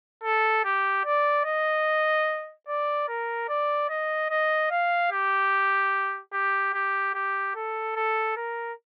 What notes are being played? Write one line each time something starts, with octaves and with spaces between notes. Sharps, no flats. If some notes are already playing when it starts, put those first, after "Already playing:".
A4
G4
D5
D#5
D5
A#4
D5
D#5
D#5
F5
G4
G4
G4
G4
A4
A4
A#4